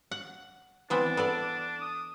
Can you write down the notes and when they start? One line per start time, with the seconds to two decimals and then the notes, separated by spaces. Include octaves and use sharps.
0.11 F#5
0.90 E3 B3 C4 D4
1.17 B3 A4 D5
1.81 D#6